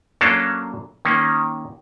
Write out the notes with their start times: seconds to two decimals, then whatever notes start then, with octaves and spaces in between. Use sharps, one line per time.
0.21 F#3 A#3 C#4 D4 A4 F5
1.05 D#3 A#3 C#4